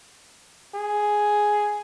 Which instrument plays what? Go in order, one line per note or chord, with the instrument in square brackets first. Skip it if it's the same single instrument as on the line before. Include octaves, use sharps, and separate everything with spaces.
[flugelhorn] G#4